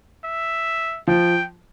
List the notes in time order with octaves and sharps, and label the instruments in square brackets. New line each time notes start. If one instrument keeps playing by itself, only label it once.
[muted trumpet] E5
[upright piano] F3 [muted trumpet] G5